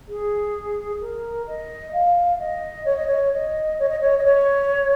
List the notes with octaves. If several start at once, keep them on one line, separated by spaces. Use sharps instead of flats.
G#4
A#4
D#5
F5
D#5
C#5
D#5
C#5
D#5
C#5
D#5
C#5
D#5
C#5